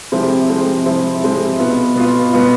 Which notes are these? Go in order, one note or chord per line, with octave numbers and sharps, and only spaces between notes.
C3 F3 G#3 C4 E4
C3 F3 G#3 C4 E4
C3 F3 G#3 C4 E4
C3 F3 G#3 C4 E4
B2 B3 F4
B2 B3 F4
B2 B3 F4